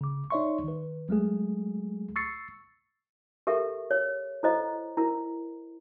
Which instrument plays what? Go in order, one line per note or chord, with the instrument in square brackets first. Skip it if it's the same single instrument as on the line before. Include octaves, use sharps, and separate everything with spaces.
[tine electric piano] C#3 D6
D#4 C#5 D5 E5 C6 C#6
D#3 B4
F#3 G#3 A3 G#4
C#6 E6 A6 C7 C#7
[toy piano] G4 A4 A#4 E5 C#6
C#5
E4 A4 C5 D#5 A#5
E4 A#4